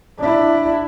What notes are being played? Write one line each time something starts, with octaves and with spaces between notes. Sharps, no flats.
D4 E4